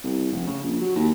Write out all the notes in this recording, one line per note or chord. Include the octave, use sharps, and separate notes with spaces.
C2
F1
C#3
A#1
F#3
D#2